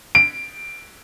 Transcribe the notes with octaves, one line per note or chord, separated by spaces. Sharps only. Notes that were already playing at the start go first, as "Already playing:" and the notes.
D7